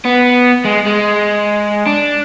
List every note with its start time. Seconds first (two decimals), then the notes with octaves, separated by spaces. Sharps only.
0.05 B3
0.65 G#3
0.86 G#3
1.87 D4